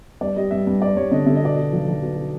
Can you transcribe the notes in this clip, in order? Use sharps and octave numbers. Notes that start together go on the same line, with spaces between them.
G2 D5
G3 D#5
G2 E5
G2
G2 D5
G2 C#5
D3 D#5
D3 E5
D#5
B2 D5
B2 D#5
B1
B1
B2
B2